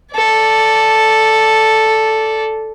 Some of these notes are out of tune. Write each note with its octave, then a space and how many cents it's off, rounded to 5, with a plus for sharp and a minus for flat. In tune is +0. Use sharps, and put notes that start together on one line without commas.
A4 +0 D5 -10